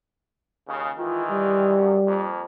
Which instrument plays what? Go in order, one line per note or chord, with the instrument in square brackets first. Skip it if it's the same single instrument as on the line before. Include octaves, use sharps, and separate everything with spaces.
[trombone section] D#2 C#3
[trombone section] D#3 E3 G#3 [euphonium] F4
[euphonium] G3
[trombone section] F#2
F2 F3 A#3